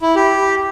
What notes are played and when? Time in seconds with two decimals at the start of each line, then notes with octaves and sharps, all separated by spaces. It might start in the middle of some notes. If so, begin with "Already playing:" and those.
0.02 E4
0.15 G4